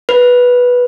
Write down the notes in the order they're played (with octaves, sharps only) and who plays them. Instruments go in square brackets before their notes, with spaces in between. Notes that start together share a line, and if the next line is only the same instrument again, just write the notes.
[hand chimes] B4